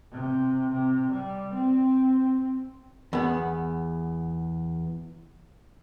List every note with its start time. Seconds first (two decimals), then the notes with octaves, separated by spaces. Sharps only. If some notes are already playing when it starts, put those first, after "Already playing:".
0.12 C3
0.70 C3
1.11 G3
1.53 C4
3.13 E2 B3